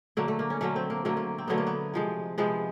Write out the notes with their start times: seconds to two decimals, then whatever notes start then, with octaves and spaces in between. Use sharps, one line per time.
0.17 D3 F#3 A3 A#3
0.28 A3
0.39 A#3
0.50 C#4
0.61 D3 F#3 A3 C#4
0.76 C4
0.90 A#3
1.05 D3 F#3 A3 A#3
1.17 A#3
1.38 C4
1.48 D3 F#3 A3 B3
1.58 A#3
1.67 B3
1.94 C3 F3 G#3
2.38 C3 F3 G#3 B3